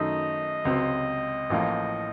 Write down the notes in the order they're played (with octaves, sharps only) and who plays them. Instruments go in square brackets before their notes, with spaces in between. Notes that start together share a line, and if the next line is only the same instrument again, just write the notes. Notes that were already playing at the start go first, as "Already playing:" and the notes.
Already playing: [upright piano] F#2 D#3 A3 D#4 [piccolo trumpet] D#5
[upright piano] C#2 C3 F#3 C4
A1 A2 F3 A#3